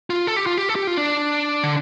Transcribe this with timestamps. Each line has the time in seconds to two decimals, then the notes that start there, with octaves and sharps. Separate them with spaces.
0.10 F4
0.27 A4
0.36 G4
0.47 F4
0.58 G4
0.69 A4
0.76 G4
0.87 F4
0.97 D4
1.63 D3